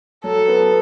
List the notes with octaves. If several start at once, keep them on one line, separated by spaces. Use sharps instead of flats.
F#3 A4
B3